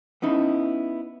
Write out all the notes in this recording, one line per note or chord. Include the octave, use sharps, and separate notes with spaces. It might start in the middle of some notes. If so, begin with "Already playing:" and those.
B3 C#4 D#4 E4